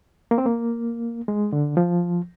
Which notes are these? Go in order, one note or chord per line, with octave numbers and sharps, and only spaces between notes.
A#3
C4
A#3
G#3
D3
F3